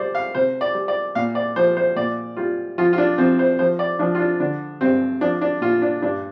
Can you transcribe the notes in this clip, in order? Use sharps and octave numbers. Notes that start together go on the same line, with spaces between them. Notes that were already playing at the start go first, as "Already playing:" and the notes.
Already playing: G3 C5 D5
F5
C3 C5
D5
G3
D5
A#2 F5
D5
F3 C5
C5
A#2 D5
G3 F4
F3 F4
F4
D4
F3 C4
C5
F3 C5
D5
F3 D4
F4
D4
D3 D4
G2 C4
F3 D4
D4
A#2 F4
D4
G2 D4